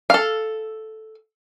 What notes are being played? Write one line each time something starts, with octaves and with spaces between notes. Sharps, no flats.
A4 F5